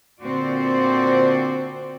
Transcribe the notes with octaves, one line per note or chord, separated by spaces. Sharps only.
A#2 D3 C4 F#4 C5 D5